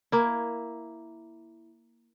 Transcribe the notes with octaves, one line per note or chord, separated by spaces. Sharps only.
A#3 E4